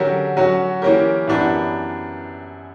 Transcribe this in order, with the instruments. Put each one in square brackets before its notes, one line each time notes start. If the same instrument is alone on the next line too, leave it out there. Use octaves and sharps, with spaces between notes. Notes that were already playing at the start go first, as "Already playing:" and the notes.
Already playing: [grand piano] D3 F#3 C#4 G4 A#4
F#3 C#4 F#4
E3 A#3 C#4 G4 A#4
F#2 E3 B3 D4 G4